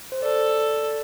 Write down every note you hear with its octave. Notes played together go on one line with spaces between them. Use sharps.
C5
A4 D5